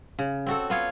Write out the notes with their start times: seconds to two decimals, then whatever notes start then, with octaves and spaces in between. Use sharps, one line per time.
0.19 C#3
0.47 C4 F#4 A4
0.70 B3 F4 C#5